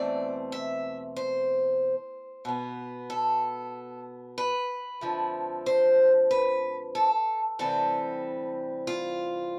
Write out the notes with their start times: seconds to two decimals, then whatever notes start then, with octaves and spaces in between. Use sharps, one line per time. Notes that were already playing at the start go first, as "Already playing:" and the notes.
Already playing: E2 B2 A3 C4 D5
0.52 E5
1.16 C5
2.45 B2 B3
3.10 A4
4.38 B4
5.01 F2 D3 F3 A3
5.66 C5
6.31 B4
6.95 A4
7.59 D2 C3 E3 G3 C4 A4
8.87 F4